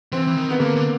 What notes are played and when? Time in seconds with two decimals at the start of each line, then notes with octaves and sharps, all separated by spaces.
0.12 E3 C4
0.27 E3
0.37 D#3
0.50 B3
0.60 D3 A#3
0.76 D3